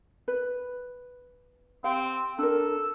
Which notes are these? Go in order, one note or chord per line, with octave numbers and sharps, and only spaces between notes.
B4
C4 G4 F5
D4 A4 A#4